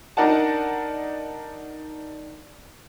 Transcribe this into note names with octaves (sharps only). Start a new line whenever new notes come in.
D4 D#4 A#4 D5 F#5 A5